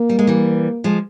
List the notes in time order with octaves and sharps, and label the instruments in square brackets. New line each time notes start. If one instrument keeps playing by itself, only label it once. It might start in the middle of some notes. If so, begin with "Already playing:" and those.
Already playing: [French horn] A#3
[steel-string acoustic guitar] G3
G#3
E3 G3
F3 G#3